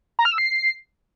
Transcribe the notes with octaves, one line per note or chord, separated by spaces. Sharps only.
A#5
F6
E6
C7